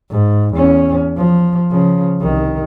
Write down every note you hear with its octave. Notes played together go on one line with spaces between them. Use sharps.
G#2
E2 C#4
F3
C#3 F3
C2 D#3